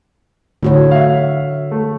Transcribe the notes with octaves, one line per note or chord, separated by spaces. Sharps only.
A2 D3 F#4 C#5
E5 F5
A3